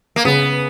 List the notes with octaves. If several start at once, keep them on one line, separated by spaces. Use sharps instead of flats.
A#3
C#3 B3